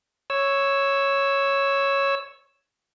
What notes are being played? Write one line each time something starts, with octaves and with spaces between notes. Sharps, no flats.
C#5 E6